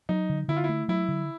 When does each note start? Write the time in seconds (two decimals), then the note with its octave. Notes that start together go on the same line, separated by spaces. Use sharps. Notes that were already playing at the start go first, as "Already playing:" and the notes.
0.09 F#3 D#4
0.29 D3
0.48 D3 E4
0.57 F4
0.64 E4
0.69 A3
0.88 F#3 E4
1.08 D3